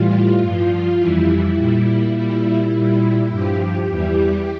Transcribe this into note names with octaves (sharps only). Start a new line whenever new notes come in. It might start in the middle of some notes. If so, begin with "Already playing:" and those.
Already playing: A2 E3 G3 F4
G2 F3
F2 E3 G3 E4
A#2 G3
A#2 G3 E4
A#2 G3
G2 F3 G4
E2 E3 G3